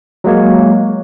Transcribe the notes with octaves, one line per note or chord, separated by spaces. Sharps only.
F#3 G#3 A#3 C#5